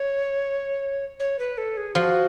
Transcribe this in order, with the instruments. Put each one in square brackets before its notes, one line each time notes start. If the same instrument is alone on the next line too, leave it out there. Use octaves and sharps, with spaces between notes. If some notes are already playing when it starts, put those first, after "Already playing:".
Already playing: [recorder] C#5
C#5
B4
A4
G#4
[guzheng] F3 [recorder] F#4